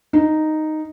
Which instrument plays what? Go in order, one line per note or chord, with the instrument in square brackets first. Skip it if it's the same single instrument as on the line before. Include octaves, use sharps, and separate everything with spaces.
[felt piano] D#4